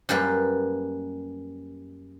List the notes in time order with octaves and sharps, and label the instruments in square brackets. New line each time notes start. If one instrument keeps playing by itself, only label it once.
[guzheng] F#2 G3 A#3 B4